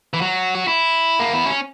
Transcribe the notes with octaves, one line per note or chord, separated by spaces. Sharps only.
E3
F#3
F#4
E4
A#3
B3
C#4